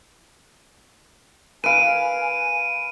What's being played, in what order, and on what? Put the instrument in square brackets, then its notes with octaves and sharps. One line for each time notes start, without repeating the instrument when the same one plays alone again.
[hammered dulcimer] B4 F5 [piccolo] G#5 [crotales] D7 D#7